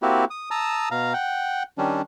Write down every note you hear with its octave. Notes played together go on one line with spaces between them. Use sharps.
A#3 C4 E4 F#4 G4
D#6
A5 A#5 D#6 E6
B2 F5 A#5
F#5 G5
D#3 G3 C#4 D4